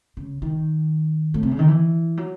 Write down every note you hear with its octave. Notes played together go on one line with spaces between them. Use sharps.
C#3
D#3
A2
C3
C#3
D#3
E3
F#3